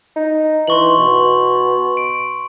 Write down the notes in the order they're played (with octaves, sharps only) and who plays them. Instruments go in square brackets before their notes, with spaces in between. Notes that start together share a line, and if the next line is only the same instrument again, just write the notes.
[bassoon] D#4
[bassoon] E3 [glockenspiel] C6 C#6 F#7
[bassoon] B2
[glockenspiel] D7